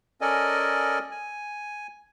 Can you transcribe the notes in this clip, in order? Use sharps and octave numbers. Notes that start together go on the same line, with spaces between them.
C#4 A4 A#4 D5 D#5 G#5
G#5